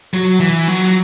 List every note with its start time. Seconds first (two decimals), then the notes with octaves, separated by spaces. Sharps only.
0.14 F#3
0.40 E3
0.68 F#3